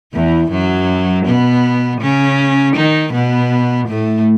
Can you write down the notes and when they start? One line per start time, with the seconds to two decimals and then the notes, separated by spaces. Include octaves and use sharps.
0.14 E2 E3
0.51 F#2 F#3
1.26 B2 B3
2.01 C#3 C#4
2.76 D#3 D#4
3.13 B2 B3
3.88 A2 A3